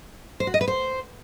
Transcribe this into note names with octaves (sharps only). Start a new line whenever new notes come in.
C5
F#4
D#5
B4
C5